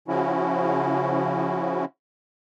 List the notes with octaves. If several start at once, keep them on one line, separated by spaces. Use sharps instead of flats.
C#3 F3 C#4 E4 F#4